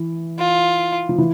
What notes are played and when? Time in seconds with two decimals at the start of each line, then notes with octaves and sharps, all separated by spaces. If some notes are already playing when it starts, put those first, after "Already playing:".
Already playing: E3
0.39 F4
1.09 F3
1.18 E3